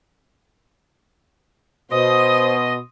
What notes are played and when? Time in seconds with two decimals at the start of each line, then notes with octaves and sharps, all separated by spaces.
1.91 B2 C5 D#5 C6 D#6